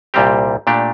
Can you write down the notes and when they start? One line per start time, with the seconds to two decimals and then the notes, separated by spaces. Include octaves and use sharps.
0.14 C2 A#2 G3 C4 G4
0.67 A#2 A3 D4 G4